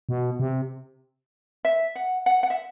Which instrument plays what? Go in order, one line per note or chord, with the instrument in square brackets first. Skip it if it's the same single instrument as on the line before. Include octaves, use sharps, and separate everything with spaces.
[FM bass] B2
C3
[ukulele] E5
F#5
F#5
F#5
E5